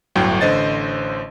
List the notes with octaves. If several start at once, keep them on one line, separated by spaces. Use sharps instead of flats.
G1 D2 A2 F#3 G5
A1 D3 C5 D#5 A6